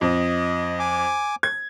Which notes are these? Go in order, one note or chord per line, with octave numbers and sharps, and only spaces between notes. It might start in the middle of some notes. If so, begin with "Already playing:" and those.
F2 D#5
G#5 D6
G#6